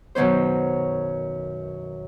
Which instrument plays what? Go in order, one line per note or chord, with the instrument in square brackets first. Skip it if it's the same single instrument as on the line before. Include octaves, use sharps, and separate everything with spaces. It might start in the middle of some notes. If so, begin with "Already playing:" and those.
[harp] F#2 B2 D#3 C#4 C5